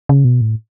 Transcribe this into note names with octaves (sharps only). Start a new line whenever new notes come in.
C#3
B2
A2